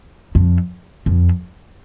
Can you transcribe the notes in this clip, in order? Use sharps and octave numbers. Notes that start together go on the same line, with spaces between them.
F2
F2